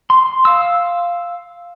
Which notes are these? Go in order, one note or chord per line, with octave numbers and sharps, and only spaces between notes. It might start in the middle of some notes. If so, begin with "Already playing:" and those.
C6
F5 E6